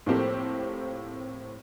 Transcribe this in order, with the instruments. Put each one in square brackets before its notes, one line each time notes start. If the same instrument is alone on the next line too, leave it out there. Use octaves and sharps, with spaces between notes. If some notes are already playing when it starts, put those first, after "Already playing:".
[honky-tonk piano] A2 F3 A#3 C4 G4 A4